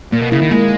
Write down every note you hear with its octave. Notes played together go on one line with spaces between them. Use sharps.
A#2 A#3
B2
C#3 E4
D#3
G#3 A#3